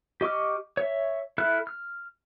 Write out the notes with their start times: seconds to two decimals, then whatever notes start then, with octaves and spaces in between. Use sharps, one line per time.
0.21 G4 D#5 C#6 D6 F6
0.77 C#5 E5
1.38 E4 A4 E5 F6 F#6
1.67 F6